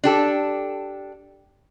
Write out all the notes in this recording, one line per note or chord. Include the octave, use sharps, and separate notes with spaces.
D4 G4 A4